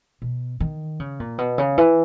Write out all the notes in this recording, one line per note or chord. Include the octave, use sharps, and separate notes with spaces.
B2
D#3
C#3
A#2
B2
C#3
E3